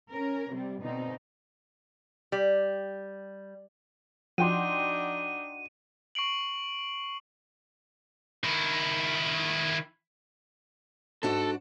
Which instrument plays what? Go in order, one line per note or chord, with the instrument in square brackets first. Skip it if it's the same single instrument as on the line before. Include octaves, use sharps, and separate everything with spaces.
[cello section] C#4 A#4
C3 G3
B2 D3 C4 D#4
[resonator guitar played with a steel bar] G3
[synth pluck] F3 [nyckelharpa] D4 D#4 [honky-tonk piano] F#4 G5 C6 [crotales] D#7
[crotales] C#6 C7 D7 F#7
[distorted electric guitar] D#3 E4
[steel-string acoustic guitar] G#2 D4 F#4 [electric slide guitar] A4